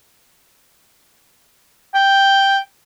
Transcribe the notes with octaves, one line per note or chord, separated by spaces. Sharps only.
G5